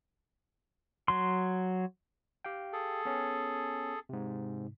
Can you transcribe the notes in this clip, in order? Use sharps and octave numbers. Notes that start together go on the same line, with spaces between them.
F#3 C6
G4 F5 G5
G#4 A4
B3 C#4
G#2 C3